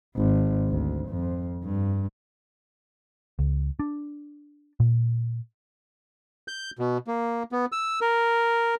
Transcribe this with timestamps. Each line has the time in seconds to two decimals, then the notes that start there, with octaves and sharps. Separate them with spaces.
0.16 G#1
0.69 D2
1.09 F2
1.64 G2
3.39 C#2
3.79 D4
4.80 A#2
6.48 G6
6.79 B2
7.07 A#3
7.52 B3
7.72 E6
8.01 A#4